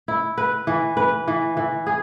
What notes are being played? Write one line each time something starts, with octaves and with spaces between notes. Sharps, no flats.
E4
B4
E3
B4
E3
E3
G#4